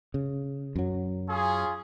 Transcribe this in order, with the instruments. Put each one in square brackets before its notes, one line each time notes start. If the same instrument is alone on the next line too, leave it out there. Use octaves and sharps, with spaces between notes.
[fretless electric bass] C#3
F#2 F#3
[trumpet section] C#4 F4 G#4